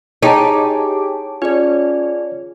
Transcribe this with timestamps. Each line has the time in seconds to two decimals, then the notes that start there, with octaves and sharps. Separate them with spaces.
0.23 D#4 G4 G#4 C#5 A5 D6
1.42 C#4 F4 G#4 D5